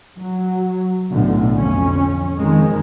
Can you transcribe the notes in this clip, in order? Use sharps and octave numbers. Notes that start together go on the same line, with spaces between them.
F#3
B1 A2 D3
F2 C#4
F2 D#3 G#3